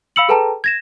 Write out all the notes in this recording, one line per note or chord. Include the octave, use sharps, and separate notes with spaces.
F5 B5 E6 C#7 F#7
G#4 A4 B4 G5 A5 A#5
G#6 A#6 E7